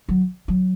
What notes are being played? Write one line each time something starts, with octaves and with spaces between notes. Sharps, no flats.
F#3
F#3